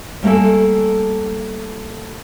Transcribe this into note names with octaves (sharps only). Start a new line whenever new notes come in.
G3 A3 A#3 G#4 A4